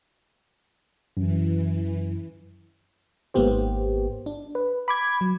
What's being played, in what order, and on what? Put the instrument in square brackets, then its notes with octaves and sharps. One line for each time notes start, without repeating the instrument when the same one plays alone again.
[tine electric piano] F#2 [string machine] E3
[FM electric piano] G#1 G#2 A#3 B3 G4 C5
D4
B4
B5 D6 G#6
F#3